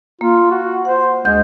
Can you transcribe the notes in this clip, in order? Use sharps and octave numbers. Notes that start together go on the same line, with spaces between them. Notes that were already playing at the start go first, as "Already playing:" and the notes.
A#3 F4
F#4
C5 F#5
D2 G#3 G6